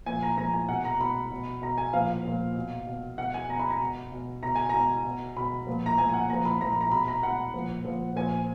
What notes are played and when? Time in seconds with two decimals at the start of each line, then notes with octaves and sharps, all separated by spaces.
0.06 A#2 F3 G#5
0.23 A#5
0.38 A#2 F3 A#5
0.54 G#5
0.69 B2 F#5
0.85 A#5
1.00 B2 B5
1.32 B2
1.62 B2 A#5
1.78 G#5
1.93 A#2 F3 F5
2.25 A#2 F3
2.56 B2
2.87 B2
3.18 B2 F#5
3.34 G#5
3.49 B2 A#5
3.59 B5
3.70 A#5
3.80 B2
4.12 B2
4.43 B2 A#5
4.55 G#5
4.69 B2 A#5
5.05 B2
5.36 B2 B5
5.67 A#2 F3
5.86 A#5
5.98 A#2 F3 G#5
6.09 G#5
6.14 F#5
6.29 A#2 F3 A#5
6.45 B5
6.61 A#2 F3 A#5
6.71 B5
6.81 A#5
6.91 B2 B5
7.08 A#5
7.23 B2 F#5
7.54 A#2 F3
7.85 A#2 F3
8.16 A#2 F3 G#5